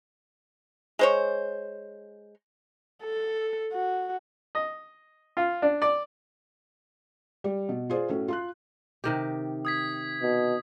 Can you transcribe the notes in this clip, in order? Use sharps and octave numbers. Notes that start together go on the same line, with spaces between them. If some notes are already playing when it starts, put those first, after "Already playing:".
G#3 C5 C#5
A4
F#4
D#5
F4
D4
D5
G3
B2
F4 G#4 C5 D5
A2 C#4 F#4
F4 C6 F#6
C3 D#3 G4
D#6 G#6 B6
B2